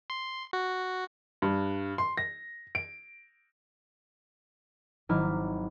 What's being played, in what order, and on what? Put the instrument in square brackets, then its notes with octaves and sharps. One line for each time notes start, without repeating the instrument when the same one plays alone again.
[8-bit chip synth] C6
F#4
[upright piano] G2
C6
A#6
D7
[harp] G#1 F#3 D#4 E4 D6 F6